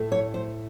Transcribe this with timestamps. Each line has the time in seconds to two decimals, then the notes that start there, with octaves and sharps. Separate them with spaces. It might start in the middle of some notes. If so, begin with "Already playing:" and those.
Already playing: A2 A3
0.12 C#5
0.34 C5